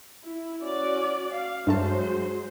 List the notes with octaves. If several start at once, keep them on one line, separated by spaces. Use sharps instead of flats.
E4
C#4 F#4 D5
F5
G2 F#3 G#3 A3 C5 A5